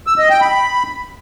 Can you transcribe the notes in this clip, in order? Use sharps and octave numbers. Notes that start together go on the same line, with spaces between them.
E6
D#5
G5
B5